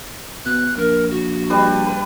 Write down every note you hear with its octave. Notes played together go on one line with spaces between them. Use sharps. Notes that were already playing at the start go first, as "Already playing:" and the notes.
B2 F#6
A#1 A#4
F#4
G3 D4 B4
B4